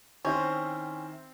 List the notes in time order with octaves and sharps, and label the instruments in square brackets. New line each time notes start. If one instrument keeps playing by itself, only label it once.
[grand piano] D#3 E4 C5 [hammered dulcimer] C4 [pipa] C#4